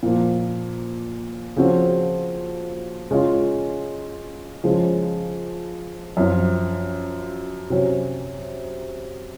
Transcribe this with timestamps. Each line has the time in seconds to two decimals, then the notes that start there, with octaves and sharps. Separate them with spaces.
0.03 A#2 F3 A#3
1.56 C#3 F3 C4 F#4
3.11 C#3 G#3 C#4 F4
4.64 C#3 F3 G#3
6.17 F#2 F3 C4 F4
7.70 C3 F#3 C#4